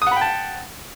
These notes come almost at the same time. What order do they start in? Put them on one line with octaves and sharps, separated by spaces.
D#6 F#5 B5 G5 A5